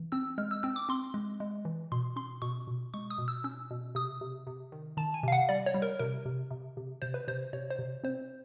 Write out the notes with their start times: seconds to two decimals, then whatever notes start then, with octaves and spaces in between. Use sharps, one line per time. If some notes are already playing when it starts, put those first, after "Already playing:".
Already playing: E3
0.12 C4 E6
0.38 G#3 F6
0.51 E6
0.63 C4 E6
0.76 D6
0.89 C4 C6
1.14 G#3
1.40 G#3
1.65 E3
1.92 B2 C6
2.16 C#4 C6
2.42 B2 C#6
2.67 B2
2.94 G#3 C#6
3.10 D#6
3.18 B2
3.28 E6
3.44 C#4 E6
3.71 B2
3.95 C3 D#6
4.21 C3
4.47 C3
4.72 D#3
4.97 D#3 A5
5.14 G#5
5.23 C3 F5
5.32 F#5
5.49 G3 D5
5.66 C#5
5.74 G3
5.82 A#4
5.99 C3 A#4
6.25 C3
6.51 C3
6.77 C3
7.02 C3 C5
7.14 B4
7.28 C3 C5
7.53 C3 C#5
7.70 C5
7.79 C3
8.04 C4 C5